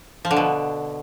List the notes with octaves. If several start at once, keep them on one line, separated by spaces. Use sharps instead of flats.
F3
D3
B2